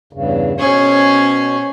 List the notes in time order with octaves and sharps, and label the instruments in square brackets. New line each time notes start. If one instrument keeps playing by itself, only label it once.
[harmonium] E2 G2 C#3
[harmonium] B2 C#5 [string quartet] C#4 G#4 C5